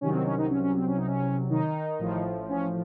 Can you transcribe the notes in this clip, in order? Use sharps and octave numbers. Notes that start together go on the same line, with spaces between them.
C2 C3 D#3 F#3 C#4
C4
C#4
D#3 D#4
C#4
C#4
C4
C#4
D#4
C#4
D#3 D#4
A1 A2 F3
C#4